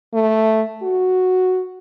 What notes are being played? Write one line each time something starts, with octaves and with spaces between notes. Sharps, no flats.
A3
F#4